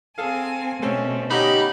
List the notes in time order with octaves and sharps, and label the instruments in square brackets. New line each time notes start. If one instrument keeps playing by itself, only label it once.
[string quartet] C4 G#5 [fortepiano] G#4 A4 F5
[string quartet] B2 [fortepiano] A3 C4 C#4
[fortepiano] D3 C#4 D#5 [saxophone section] D#4 G4 [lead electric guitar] B5